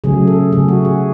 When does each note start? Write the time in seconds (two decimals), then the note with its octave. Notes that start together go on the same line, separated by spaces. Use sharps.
0.04 C#3 F#3 A3 G#4
0.27 A4
0.52 C#3 F#3 A3 G#4
0.68 F#4
0.85 G#4